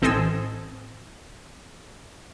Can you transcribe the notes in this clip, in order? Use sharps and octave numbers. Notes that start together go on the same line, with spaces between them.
A1 C4 A4 D#5 G#5 E6